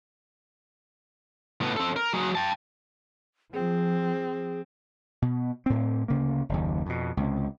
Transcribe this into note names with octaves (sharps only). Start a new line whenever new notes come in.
A2 B3
C4 A4
A#4
F#3 G#4
G5 A5
F3 C4 G#4
B2
A2 C4
D2 C#3 A#3
F#1 D#2
F2 B2
C#2 C3